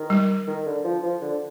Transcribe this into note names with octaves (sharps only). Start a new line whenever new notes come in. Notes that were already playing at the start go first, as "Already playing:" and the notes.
Already playing: D#3
G3
D#3
D3
F3
F3
D3